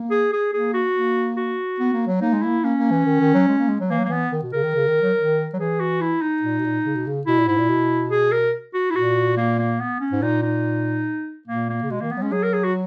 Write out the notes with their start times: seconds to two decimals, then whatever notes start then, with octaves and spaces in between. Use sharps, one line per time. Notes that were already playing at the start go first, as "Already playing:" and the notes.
Already playing: A#3
0.11 G#4
0.33 G#4
0.53 A#3 G#4
0.74 F#4
0.95 A#3
1.37 F#4
1.80 B3
1.93 A#3
2.07 F#3
2.21 A#3 D#4
2.33 G#3
2.42 A#3 E4
2.63 A#3 C#4
2.78 A#3
2.91 E3
3.05 D#3
3.20 D#3
3.34 F#3
3.48 G#3
3.59 A#3
3.69 G#3
3.80 F#3
3.90 E3 A#3
3.99 F#3
4.05 A#3
4.09 E3 B3
4.32 D#3
4.43 B2
4.53 C#3 A#4
4.63 D#3
4.75 C#3
4.88 D#3
5.02 F#3
5.17 D#3
5.54 F#3
5.59 E3 G#4
5.80 F#4
6.01 E4
6.22 D#4
6.42 A#2
6.59 B2
6.64 A#2
6.86 C#3
6.95 B2
7.07 C#3
7.26 B2 E4
7.38 A#2
7.47 G#2 E4
7.58 A#2
7.69 B2
8.11 G#4
8.32 A#4
8.74 F#4
8.90 E4
8.95 A#2 F#4
9.37 A#3
9.59 A#3
9.80 B3
10.00 C#4
10.12 G#2
10.22 A#2 D#4
10.43 D#4
11.48 A#2 A#3
11.70 A#3
11.82 C#3
11.90 B2 G#3
12.01 D#3 A#3
12.11 A#3 B3
12.17 F#3
12.22 G#3 C#4
12.32 F#3 G#4
12.43 A#4
12.53 G#4
12.64 F#4